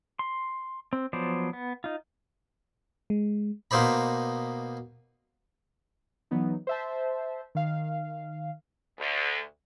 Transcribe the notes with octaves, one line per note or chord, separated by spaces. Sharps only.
C6
C4
F3 F#3 B3 C5 D5
B3
D#4 F4
G#3
B2 A#3 D#4 C5 D5 B5
E3 F#3 B3 D#4
C5 E5 A5
D#3 F5
D2